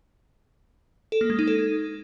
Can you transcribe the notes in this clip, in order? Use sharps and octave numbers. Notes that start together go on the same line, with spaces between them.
A4
A#3
G#3
D#4
A4